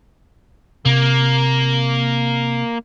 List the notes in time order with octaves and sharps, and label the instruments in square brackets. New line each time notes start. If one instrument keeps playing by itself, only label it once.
[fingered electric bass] C3 [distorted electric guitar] A#3